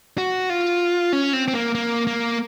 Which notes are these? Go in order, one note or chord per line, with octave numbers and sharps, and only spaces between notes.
F#4
F4
C#4
C4
C4
A#3
A#3
A#3